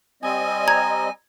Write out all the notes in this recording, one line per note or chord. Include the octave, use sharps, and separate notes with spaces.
G3 C4 D#5 G#5
A#5 G#6